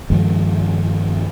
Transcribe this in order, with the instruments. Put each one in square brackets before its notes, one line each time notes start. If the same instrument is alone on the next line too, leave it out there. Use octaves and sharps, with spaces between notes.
[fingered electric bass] G2 D#3 F3 G#3